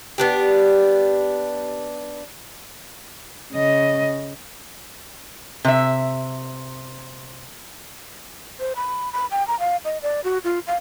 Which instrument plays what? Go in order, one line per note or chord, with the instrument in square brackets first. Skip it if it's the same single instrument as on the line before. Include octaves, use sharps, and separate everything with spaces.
[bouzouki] B3 D4 G4
[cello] C#3 D#5
[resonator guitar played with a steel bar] C3 E5
[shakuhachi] C5
B5
B5
G5
A#5
F5
D#5
D5
F#4
F4
F5